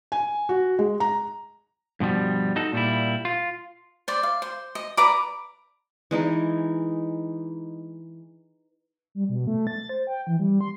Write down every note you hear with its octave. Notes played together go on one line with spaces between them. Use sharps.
G#5
F#4
G#3
A#5
G2 B2 F3 G3
D#4 F#4 A4
A#2 G3 E4
F4
C5 D5
F5
C5
D#5
B4 D5 A#5 D6
E3 G#3 D#4 A#4
G3
B2
A3
A6
C5
G5
E3
G3
C6